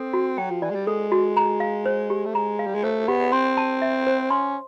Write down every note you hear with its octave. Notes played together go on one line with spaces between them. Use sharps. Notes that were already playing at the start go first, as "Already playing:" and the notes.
Already playing: C4 A4
F#4
F#3 G5
F3
E3 D5
G#3
G3
G#3 A4
F#4
A#5
F5
C5
G4
A3
G#3 A#5
F5
G3
G#3
A3 C5
B3 G4
C4 C6
A5
E5
C5
C#4 C6